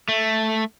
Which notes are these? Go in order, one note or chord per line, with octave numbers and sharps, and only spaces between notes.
A3